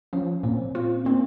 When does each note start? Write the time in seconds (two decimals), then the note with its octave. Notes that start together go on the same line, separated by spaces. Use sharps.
0.13 F3 C#4
0.43 A#2 C4
0.75 C4 F4
1.05 A#3 C4